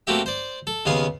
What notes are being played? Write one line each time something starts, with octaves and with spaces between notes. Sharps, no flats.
A3 A#3 C4 F#4 G4 E5
C5 D5
A4
D#2 C#3 B3 F5 G#5 C6